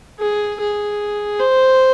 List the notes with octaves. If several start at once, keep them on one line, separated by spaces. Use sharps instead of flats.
G#4
G#4
C5